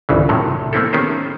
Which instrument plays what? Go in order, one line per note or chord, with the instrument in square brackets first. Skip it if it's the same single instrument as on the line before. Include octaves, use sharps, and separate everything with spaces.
[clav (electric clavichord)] G1 C2 C#3 E3
A2 C3 D#3 F#3
A3 A#3 C4 E4 A4
D#3 B3 C#4 G4 G#4 C5